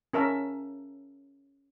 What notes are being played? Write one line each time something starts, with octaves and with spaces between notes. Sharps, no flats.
C#4 A#4 E5 A5